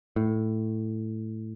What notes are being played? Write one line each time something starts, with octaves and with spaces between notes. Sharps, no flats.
A2